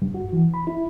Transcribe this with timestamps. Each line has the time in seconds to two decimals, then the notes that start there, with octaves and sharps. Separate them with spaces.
0.02 G2
0.14 F#4
0.33 E3
0.54 B5
0.67 E4